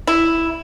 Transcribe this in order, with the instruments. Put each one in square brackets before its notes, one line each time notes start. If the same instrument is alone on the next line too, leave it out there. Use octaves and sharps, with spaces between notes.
[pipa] E4